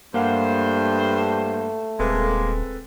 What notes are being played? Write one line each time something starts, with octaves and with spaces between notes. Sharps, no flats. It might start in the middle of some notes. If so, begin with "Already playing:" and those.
G2 A3 A#3 C5 F5 F#5
D#1 G#3 A#3 C4 A4 B4